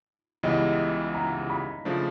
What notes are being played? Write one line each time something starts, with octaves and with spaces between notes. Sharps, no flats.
C#2 C#3 E3 G3 B3 D#5
A#5
B5
C#3 F3 A3 D4